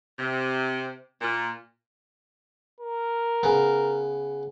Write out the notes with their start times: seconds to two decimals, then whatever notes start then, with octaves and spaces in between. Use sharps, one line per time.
0.19 C3
1.21 A#2
2.80 A#4
3.43 C#3 B3